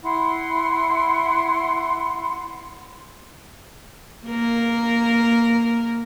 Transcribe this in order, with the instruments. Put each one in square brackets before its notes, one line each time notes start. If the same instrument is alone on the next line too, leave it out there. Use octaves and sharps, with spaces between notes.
[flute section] E4 F#5 C6
[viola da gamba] A#3 A#4